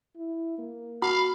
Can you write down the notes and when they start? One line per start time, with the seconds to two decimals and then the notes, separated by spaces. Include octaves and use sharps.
0.16 E4
0.59 A#3
1.02 F#4 F5 B5